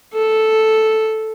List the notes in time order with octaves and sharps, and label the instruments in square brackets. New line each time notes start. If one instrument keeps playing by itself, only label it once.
[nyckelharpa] A4